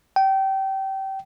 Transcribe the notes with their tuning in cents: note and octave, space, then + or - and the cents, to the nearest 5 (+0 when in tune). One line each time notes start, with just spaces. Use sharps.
G5 -25